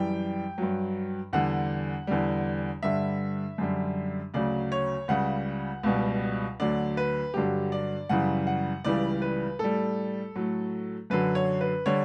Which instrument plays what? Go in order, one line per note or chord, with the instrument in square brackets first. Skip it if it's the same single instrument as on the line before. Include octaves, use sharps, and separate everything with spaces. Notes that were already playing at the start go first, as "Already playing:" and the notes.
Already playing: [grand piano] F#2 E3 G3 G5
G2 F#3
E2 D3 G3 F#5
E2 D3 G3
G2 D3 G3 E5
F#2 D3 G3
D2 C#3 F#3 D5
C#5
C#2 C#3 G3 F#5
C#2 B2 G3
D2 D3 F#3 D5
B4
G2 D3 F#3 G4
D5
F#2 C#3 E3 G3 F#5
F#5
C#2 C#3 E3 G3 D5
B4
A2 G3 A4
A2 F#3
F#2 D3 F#3 B4
C#5
B4
D3 G3 C#5